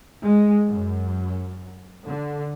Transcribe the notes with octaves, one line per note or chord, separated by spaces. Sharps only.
G#3
F#2
D3